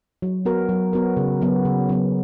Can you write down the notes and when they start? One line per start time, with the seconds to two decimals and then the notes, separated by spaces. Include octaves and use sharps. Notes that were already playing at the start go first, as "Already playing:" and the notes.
0.22 F#3
0.45 B3 F#4 A#4
0.69 F#3
0.93 B3 F#4 A#4
1.17 C#3
1.42 F#3 B3
1.65 C#3
1.89 F#3 B3